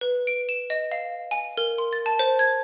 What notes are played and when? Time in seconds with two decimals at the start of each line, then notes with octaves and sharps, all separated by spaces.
0.01 B4
0.27 D7
0.49 E7
0.70 D#5
0.92 F5
1.31 G#5
1.57 A#4
1.78 C6
1.93 A6
2.06 A5
2.19 C5
2.39 G#6